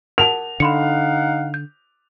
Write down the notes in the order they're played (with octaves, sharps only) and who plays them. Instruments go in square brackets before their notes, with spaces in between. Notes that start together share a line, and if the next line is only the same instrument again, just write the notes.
[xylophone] A#4 F#5 A5 [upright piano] F7
[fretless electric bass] D3 [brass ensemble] D#4 F5 F#5 [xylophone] B5 C6 C#7
[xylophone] G6